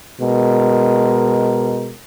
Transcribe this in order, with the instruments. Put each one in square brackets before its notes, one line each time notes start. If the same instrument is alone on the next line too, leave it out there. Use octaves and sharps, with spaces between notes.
[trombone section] B2 G#3 A#4